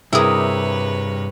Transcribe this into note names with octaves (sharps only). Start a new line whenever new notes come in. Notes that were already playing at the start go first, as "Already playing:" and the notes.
G2 C3 E4 G#4 A#4 B4 C#5